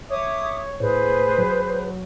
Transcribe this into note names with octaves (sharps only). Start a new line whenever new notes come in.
C#5 E5 D6 D#6
A2 G#4 B4 C5
F#3